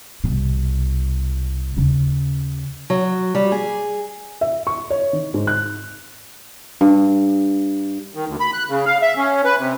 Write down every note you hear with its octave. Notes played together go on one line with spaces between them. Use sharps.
C2 B2
D#2 C#3
F#3
G3
G#4
E5
C#6
C#5
D#3
G#2
F#6
G2
D#3
D2
B5
F#6
C#3
F5
E5
C#4
B4
C3